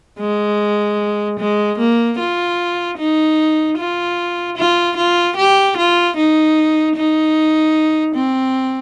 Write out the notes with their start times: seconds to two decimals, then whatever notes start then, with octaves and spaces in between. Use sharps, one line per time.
0.20 G#3
1.39 G#3
1.79 A#3
2.19 F4
2.98 D#4
3.78 F4
4.57 F4
4.97 F4
5.37 G4
5.77 F4
6.16 D#4
6.96 D#4
8.15 C4